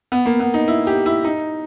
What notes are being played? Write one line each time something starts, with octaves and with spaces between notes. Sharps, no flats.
B3
A#3
B3
D#4
E4
G4
E4
D#4